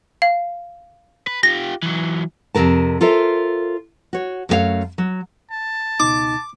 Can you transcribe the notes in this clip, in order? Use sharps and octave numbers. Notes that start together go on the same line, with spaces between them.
F5
B4
F4 G4 A#6
E3 F#3
F2 G#2 C3 A#4 A5
F4 A4 A#4 C5 E5
F#4 C#5
F#2 A3 D#4 G4 C#5 F5
F#3
A5
C#2 B2 D#4 D6